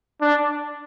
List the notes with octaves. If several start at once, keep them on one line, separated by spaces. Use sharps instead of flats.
D4